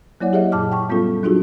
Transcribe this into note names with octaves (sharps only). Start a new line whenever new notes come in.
F#3 A#3 E4 C#5 D5 F#5
G4 G#4 C#5 D#5 E5 F#5
F#2 A#2 A5 D6 F6
G5 A5 C#6
G3 B3 C#4 F4 A4
F#3 D4 D#4 F4 F#4 G#4